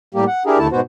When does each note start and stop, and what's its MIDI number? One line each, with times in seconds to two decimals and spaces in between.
0.15 0.25 45
0.15 0.25 55
0.15 0.25 58
0.15 0.25 67
0.27 0.43 78
0.46 0.58 62
0.46 0.58 64
0.46 0.58 67
0.46 0.58 68
0.46 0.58 70
0.59 0.68 39
0.59 0.68 50
0.59 0.68 57
0.59 0.68 64
0.59 0.68 81
0.72 0.80 44
0.72 0.80 47
0.72 0.80 59
0.72 0.80 66
0.72 0.80 72